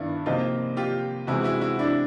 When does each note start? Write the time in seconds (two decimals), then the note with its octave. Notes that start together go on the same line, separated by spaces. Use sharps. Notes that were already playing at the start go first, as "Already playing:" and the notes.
Already playing: G2 D#3 B3 D4 E4
0.26 C3 F3 A#3 D#4 F4
0.77 F4 G4
1.27 C3 E3 G#3 B3 E4 F#4
1.44 E4 F#4
1.61 E4 F#4
1.79 D4 E4